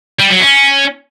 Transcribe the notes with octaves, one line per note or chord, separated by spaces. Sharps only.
G3
F#3
C#4